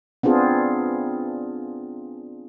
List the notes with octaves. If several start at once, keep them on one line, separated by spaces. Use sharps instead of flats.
B3 C4 D4 F4 G#4